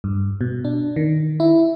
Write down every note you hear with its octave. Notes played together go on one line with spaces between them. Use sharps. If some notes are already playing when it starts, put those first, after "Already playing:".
G2
B2
D4
D#3
E4